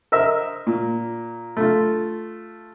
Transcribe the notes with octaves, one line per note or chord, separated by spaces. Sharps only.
A#4 C5 D#5 E5
A#2
A3 F4